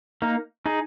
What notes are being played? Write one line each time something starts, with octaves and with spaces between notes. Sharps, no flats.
A#3 D#4
D#4 G#4